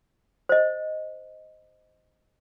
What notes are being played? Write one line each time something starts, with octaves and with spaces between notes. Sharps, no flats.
C5 D#5